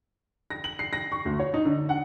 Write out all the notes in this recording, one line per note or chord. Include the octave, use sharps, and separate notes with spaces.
A#6
F#7
C7
A#6
C#6
D2
C#5
D#4
D3
F#5